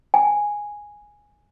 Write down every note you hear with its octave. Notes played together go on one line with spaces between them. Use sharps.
G#5